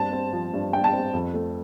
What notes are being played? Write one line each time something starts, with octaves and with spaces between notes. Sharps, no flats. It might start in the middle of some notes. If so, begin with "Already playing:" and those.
Already playing: G2 C4 A5
C4
F3
G2
G2 G5
A5
C4
F2
A3